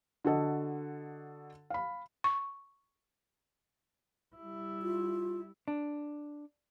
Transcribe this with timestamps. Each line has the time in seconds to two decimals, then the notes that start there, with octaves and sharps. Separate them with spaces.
0.25 D3 F#4 A4 D#5
1.70 F5 B5
2.24 C#6
4.36 G3 E4
4.82 F4
5.68 D4